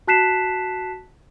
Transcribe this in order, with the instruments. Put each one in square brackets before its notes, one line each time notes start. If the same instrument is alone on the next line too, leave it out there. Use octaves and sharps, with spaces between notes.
[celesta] F#4 A5 F#6 B6 C7 E7